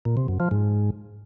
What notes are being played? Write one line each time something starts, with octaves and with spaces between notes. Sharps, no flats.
A#2
C3
F#2
F3
G#2